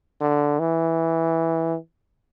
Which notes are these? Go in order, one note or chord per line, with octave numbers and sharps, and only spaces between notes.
D3
E3